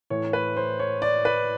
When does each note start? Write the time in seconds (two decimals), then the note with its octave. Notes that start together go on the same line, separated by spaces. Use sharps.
0.10 A2 E3 C#5
0.33 B4
0.57 C5
0.79 C#5
1.02 D5
1.25 B4